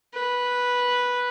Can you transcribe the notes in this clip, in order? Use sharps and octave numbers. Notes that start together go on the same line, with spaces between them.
B4